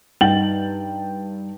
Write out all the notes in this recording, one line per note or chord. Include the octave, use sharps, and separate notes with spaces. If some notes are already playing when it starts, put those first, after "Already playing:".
G2 D#4 G5 A6 F#7